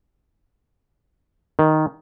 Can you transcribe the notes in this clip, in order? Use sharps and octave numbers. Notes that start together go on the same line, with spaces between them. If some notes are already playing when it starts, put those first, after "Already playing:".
D#3